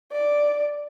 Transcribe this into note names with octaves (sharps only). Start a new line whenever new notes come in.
D5